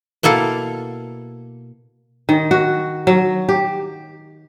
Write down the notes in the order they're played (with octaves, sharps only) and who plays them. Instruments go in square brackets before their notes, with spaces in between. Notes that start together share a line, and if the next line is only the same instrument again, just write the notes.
[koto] B2 A#3 E4 A4 F5
[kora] D#3
F#4
F#3
G4